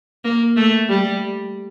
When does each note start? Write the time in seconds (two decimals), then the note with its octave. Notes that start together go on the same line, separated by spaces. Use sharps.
0.24 A#3
0.56 A3
0.89 G3